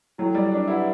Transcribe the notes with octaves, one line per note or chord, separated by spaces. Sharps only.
F#3 E4 A4 C#5 G5
G3
D4
E4 G4 B4 F#5